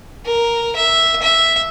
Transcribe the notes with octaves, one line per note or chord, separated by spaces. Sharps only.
A#4
E5
E5